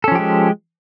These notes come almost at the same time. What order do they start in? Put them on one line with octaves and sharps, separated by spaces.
A4 C#4 F3 G4 G#3